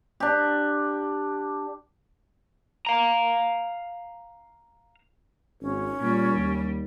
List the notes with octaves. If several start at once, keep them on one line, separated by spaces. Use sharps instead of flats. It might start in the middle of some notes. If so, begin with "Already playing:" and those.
D4 G4
F5 A#5
G#1 C#4
A#2 G3
D#2